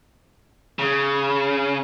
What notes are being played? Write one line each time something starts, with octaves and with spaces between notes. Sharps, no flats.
C#3